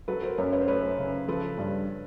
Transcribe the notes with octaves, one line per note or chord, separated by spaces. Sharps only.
F#3 A4 B4
A#4 C5
F#2 B4 C#5
B4 C#5
C5
A3 B4 C#5
C#3
F3 A4 B4
G2